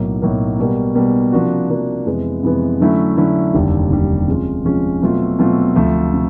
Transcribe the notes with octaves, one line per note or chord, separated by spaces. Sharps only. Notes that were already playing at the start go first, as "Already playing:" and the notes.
Already playing: B1 A2 F#3 A#3 D#4
B1 A2 F#3 A#3 D#4
B2 G3 A#3
B2 G3 A#3
C3 F3 A#3 D4 F#4
C3 F3 A#3 D4 F#4
F2 C3 E3 G#3 B3
F2 C3 E3 G#3 B3
D3 F#3 A3 C#4 E4
D3 F#3 A3 C#4 E4
F1 D#2 D3 G3
F1 D#2 D3 G3
C3 F3 G#3 C#4 F4
C3 F3 G#3 C#4 F4
B2 F#3 A3 C4 F4
B2 F#3 A3 C4 F4
D2 C3 F3 A3
C3